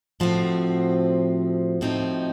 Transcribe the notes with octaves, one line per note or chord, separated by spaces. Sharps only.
A2 F3 C4 F#4
A2 F3 C4 D#4